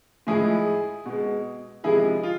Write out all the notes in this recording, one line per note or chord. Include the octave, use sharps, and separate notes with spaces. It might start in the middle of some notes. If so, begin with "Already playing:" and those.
A2 F3 G#3 E4 G#4
B2 G#3
C3 F3 G#3 E4 G#4
F4